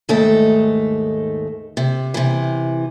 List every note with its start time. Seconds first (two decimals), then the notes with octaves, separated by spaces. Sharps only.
0.09 D#2 G#2 A3 D#4 A4
1.77 C3
2.14 C3 E3